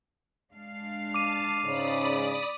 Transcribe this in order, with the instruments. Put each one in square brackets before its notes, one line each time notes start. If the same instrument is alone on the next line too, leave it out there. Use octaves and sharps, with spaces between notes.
[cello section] G#3 D4 F5
[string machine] A5 [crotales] D6 D#7
[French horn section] G#2 C#3 C#4 [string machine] D5 B5 D#6